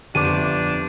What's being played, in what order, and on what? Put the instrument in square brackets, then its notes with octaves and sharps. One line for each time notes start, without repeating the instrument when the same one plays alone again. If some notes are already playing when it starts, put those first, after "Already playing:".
[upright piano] G1 D6 [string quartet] F2 C3 [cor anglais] D4 [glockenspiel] D#7